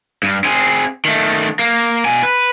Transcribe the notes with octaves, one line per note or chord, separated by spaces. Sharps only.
G2
C4 G#4
D#3 A3
A#3
B2 G#5
B4